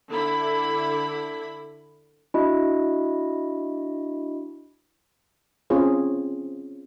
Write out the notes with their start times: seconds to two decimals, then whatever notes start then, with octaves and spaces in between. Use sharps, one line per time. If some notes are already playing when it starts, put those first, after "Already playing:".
0.11 D3 E4 B5
2.34 D4 E4 F#4 D#5
5.70 C4 C#4 F4 G#4 C#5